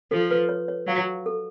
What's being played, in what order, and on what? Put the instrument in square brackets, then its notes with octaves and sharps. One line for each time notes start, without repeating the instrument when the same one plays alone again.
[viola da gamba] F3 [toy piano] A4
[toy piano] B4
C#5
C#5
[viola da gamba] F#3 [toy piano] F5
[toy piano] A4